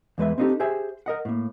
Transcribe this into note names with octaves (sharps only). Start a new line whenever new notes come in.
E2 G#3 B4 E5
C4 D4 D#4 F4 G4 A4
G4 G#4 C5 E5 G#5
A#4 D#5 F#5
A2 A#3